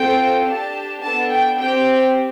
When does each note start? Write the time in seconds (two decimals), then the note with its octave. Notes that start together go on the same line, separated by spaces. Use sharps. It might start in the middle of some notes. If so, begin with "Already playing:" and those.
Already playing: C4 F4 A4 G5
0.46 D4 G4 A5
1.03 B3 D4 A4 A5
1.32 G5
1.60 C4 G4 G5